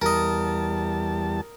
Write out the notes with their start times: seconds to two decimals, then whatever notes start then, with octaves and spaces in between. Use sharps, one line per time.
0.02 E2 G3 A#4 D#5 A5